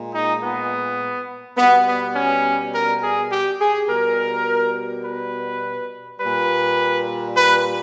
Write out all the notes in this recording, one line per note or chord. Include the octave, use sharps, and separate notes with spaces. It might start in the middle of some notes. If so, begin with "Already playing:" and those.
Already playing: A#2 G#3
D#4
B3
B2 G3 B3
B3
C#4
A#4
G#4
G4
G#4
B2 G3 A#4
B4
A#2 G3 B4
B4